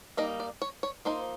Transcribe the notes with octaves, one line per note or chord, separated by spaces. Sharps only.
G3 A#3 D#4 D#5
D5
C#5
C#5
F3 A#3 D#4 C5